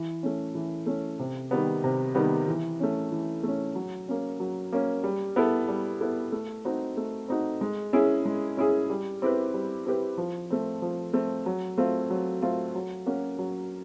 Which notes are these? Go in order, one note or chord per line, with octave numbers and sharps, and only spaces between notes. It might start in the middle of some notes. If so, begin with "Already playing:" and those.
Already playing: E3
A3 C#4
E3
A3 C#4
C3
D#3 G3 B3
C3
D#3 G3 B3
E3
A3 C#4
E3
A3 C#4
F#3
A#3 C#4
F#3
A#3 C#4
G3
B3 E4 A4
G3
B3 E4 A4
A3
C4 D#4 F#4
A3
C4 D#4 F#4
G#3
C#4 E4 G#4
G#3
C#4 E4 G#4
G3
C4 E4 G4 B4
G3
C4 E4 G4 B4
F3
A3 C4
F3
A3 C4
F#3
A3 C4 F4
F#3
A3 C4 F4
F#3
A#3 C#4 F#4
F#3